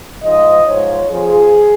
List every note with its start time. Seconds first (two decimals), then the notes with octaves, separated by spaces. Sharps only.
0.22 G#2 F3 D#5
0.66 G#2 F3 C#5
1.10 F2 F3 G#4